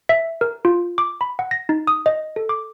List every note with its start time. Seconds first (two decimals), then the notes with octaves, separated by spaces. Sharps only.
0.09 E5
0.41 A#4
0.65 F4
0.98 D6
1.21 B5
1.39 F#5
1.51 A#6
1.69 D#4
1.87 D#6
2.06 D#5
2.36 A4
2.49 D6